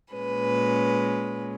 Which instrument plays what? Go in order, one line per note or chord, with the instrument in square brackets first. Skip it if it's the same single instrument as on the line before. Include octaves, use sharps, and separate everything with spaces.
[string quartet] A#2 G#3 C#4 B4